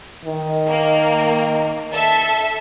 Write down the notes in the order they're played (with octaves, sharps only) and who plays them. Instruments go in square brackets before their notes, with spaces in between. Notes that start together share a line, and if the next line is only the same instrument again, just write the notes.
[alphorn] D#3
[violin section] A#3
A4 E5